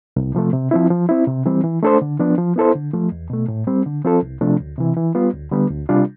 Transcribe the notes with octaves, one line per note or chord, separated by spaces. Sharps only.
C2
C3 F3 A3
C3
F3 C4 E4
F3
C4 E4
C3
E3 G3 C4
E3
A3 D4 A4 C5
D3
F3 B3 D4
F3
B3 E4 A4 C5
D3
F3 A3
E2
B2 A3
A2
G3 C4
D3
F3 C4 F4 A4
C2
C3 F3 A3 D4
D2
C3 E3
E3
G3 B3 F4
D2
D3 G3 B3
D2
C3 G3 D4 F4